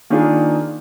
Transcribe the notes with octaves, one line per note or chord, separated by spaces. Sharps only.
D#3 A#3 D4 F4 G#4